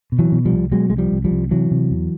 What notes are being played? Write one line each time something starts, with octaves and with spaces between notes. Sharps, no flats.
B2
E3 F#3
B2
F3 G3
C2
B2 F#3 G#3
C2 G#3
F3 G3
C2
F3 G3
C2
C3 E3 F#3
C3
E2